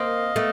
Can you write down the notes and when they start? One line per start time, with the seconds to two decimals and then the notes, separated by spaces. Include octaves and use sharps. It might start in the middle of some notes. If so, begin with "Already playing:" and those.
Already playing: A#3 C4 D#5 F5
0.36 A3 B3